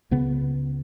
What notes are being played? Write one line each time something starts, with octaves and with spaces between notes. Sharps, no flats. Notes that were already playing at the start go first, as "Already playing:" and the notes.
C#2 C#3 B3